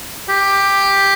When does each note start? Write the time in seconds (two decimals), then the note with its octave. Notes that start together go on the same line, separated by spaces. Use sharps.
0.29 G4